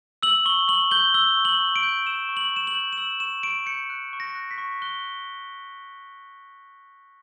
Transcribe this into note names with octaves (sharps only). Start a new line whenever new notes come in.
E6 F#7
C#6 G7
C#6 F#7
G6 G7
E6 G7
C#6
F#7
C#6
D7
G6
E6 E7
C#6
F#7
C#6 E7
F#7
G6
E7
E6 F#7
C#6 E7
C#6 D7
G6 C#7
F#6
C#6
A#6
F#6
B6
C#6
F#6 G7